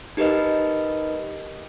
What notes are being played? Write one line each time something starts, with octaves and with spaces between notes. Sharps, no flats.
D#4 G4 A#4 B4 D#5